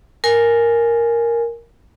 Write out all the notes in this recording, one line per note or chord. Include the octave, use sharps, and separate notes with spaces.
A#4 G#5